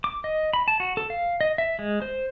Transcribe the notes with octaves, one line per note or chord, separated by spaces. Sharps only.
D6
D#5
B5
A5
F#4
A4
F5
D#5
E5
G#3
C5